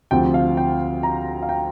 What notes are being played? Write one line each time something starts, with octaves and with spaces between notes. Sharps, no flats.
D2 C3 F3 C4 F4 G5
F5
G5
A#5
F5
G5